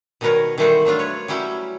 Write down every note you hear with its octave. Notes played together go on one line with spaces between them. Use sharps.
B2 D#3 G3 A#4 B4 C#5
D#3 E3 G3 A3 C5 F#5
F#3 A3 D4 F4
B4 C#5
F#3 G3 C#4 E4 G4